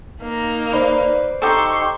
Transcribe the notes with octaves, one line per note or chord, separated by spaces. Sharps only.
A#3 D#4
B4 C5 D5
D#4 G4 A4 C6 C#6